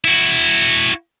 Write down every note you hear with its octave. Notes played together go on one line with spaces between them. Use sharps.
E4 F#4